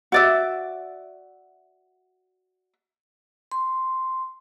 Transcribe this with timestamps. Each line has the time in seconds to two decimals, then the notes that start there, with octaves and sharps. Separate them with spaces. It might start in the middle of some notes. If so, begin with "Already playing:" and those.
0.12 F#4 D5 E5
3.52 C6